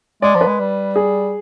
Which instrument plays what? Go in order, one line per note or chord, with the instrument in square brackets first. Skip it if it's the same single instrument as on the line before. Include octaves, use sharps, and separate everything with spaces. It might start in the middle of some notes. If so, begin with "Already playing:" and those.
[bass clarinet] G#3 [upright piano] D5
[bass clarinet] F3
[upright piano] B4
[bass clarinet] G#3
G3
[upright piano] G#4